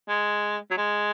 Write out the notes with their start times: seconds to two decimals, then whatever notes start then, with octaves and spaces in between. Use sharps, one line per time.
0.09 G#3
0.71 F#3
0.77 G#3